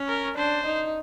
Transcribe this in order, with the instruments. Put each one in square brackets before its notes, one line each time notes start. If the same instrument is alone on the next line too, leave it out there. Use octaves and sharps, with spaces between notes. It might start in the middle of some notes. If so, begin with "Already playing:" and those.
Already playing: [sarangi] C#4
[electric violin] A#4
[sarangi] D4 [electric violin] C5
[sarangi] D#4